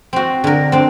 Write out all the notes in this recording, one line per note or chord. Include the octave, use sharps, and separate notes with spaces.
C4 F#4
D3 A#4
C4 D4